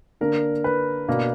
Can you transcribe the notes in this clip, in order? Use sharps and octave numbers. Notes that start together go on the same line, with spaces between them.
D3 A#3 D4 A#4
B4
B2 A#3 D4